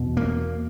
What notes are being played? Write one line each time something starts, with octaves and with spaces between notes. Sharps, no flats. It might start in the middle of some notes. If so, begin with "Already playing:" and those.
Already playing: E2 B2
A#3